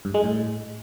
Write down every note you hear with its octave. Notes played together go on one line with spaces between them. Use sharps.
G2
G#3
A2